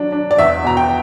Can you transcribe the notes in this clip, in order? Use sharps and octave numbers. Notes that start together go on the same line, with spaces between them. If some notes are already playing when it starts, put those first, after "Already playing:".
Already playing: F#3 D4
D4
D5
E2 E5
B2 A#5
G5